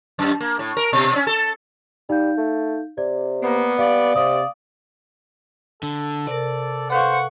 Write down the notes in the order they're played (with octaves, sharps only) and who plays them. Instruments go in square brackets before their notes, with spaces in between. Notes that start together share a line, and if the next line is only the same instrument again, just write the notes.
[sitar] F#2
A#3
A2
A#4
B2
C#4
A4
[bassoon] G3 [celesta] D#4 F5 G6
[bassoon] A3
[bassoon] C3 [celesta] D5
[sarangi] A#3 [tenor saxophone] B3
[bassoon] G3 [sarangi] D5 [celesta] F5
[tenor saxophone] C3 [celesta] F5 D#6
[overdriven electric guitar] D3 [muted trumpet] A4
[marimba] C3 A#4 [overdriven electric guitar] D5
[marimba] A4 B4 F5 [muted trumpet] C5 [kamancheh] F#5 C#6